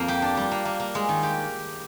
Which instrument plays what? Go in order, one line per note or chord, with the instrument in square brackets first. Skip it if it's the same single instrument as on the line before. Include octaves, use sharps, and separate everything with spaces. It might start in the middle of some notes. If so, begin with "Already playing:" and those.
Already playing: [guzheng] F2 A#3
G4
D4
G3
A#3
A#3
A#3
G#3
D#3
G4